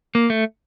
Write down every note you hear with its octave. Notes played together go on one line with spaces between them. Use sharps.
A#3
A3